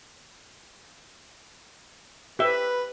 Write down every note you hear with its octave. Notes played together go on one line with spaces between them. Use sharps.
G4 B4 E5